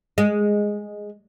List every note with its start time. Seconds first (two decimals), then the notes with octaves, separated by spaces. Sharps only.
0.18 G#3